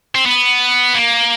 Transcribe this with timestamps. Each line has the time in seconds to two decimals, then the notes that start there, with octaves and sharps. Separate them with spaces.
0.15 C4
0.26 B3
0.94 A#3